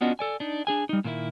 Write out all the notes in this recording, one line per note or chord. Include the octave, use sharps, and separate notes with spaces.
B3 C#4 D4 F4 F#4 D#5
A4 D5 G#5
D4 D#4
D4 G#4 G#5
G3 D#4
A#2 D#3 A#3 D4 E4